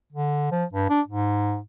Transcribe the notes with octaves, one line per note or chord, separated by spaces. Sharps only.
D3
F3
G2
D4
G#2